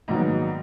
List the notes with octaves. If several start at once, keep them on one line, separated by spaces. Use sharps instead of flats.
A#1 G#2 D#3 F#3 B3 D#4